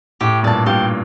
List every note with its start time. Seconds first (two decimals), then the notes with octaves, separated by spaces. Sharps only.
0.21 A2 G4
0.43 G2 A#2 D5 A5
0.66 G2 A#2 G4